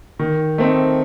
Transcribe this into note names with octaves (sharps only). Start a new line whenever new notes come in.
D#3
A3 C4 D#4